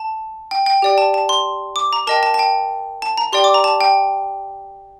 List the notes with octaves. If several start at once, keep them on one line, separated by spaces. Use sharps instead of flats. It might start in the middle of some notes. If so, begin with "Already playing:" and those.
Already playing: A5
G5
G5
G4 D5 G5
A5
A5
C6
D6
A#5
A#4 D#5 G5 A5
A5
A5
G5
A5
A#5
G4 D5 G5 C6
D6
A#5
A5
G5